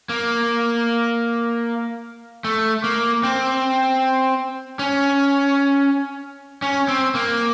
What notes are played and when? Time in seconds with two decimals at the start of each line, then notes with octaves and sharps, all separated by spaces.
0.09 A#3
2.44 A3
2.84 A#3
3.23 C4
4.79 C#4
6.62 C#4
6.88 C4
7.15 A#3